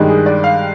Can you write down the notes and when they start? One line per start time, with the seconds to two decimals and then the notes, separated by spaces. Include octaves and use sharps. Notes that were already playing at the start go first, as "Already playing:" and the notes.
Already playing: G2 D#3 G#3
0.08 G#4
0.26 D5
0.44 F5